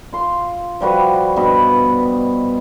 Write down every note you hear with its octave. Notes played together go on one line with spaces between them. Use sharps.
F4 C6
F3 G3 F#4 B4
G2 B2 D#5 B5